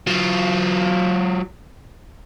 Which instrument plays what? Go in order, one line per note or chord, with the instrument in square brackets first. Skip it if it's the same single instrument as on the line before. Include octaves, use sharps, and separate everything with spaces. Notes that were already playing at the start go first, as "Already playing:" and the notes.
[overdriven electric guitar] F#3 F4